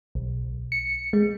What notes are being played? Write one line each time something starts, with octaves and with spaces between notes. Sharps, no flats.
B1
C#7
G#3